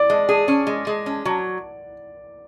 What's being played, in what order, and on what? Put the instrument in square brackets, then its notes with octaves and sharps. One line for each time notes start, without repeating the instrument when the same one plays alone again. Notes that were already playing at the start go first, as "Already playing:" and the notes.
Already playing: [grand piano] D5
[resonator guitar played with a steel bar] G#3
G#4
C#4
G#3
G#3
C#4
F#3